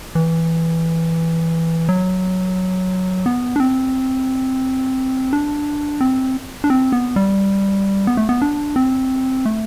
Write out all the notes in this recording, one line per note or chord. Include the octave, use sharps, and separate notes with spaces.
E3
F#3
B3
D4
C4
D4
C4
D4
C4
B3
G3
B3
A3
B3
D4
C4
A3